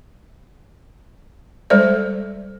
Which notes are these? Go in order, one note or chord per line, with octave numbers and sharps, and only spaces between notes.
G3 G#3 A4 C5 D5